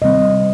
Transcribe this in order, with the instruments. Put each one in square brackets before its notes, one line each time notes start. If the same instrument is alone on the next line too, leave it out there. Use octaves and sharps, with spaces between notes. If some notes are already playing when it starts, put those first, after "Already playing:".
[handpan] C3 D#3 G3 C4 D#5